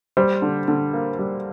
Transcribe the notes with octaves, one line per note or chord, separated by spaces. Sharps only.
G3 C5
D3
D3
A#3
G3